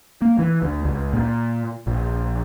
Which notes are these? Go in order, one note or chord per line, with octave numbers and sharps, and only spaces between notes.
A#3
E3
D2
C#2
A#2
A#1